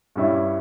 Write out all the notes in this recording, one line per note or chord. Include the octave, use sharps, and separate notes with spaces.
G2 G3 C#4 E4